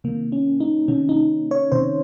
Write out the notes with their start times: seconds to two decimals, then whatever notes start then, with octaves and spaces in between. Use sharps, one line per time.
0.04 C3 D#3 A#3
0.32 C#4
0.60 D#4
0.88 C3 D#3 C#4
1.09 D#4
1.51 C#5
1.72 C3 D#3 C5